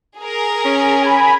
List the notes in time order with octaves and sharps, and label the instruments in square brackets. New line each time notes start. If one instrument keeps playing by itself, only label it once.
[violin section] G#4 A#4
[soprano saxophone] C#4
[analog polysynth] G#5 B5